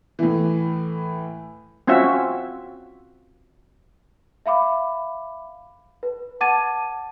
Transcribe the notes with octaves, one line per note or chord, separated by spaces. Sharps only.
A2 E3
C4 C#4 F4 F#4 E5
E5 F5 B5 D6
B4
F#5 A5 D6 G#6 A6 D#7